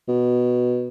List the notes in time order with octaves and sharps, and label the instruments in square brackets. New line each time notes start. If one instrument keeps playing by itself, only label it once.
[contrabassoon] B2